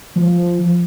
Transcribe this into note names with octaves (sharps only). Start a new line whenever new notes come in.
F3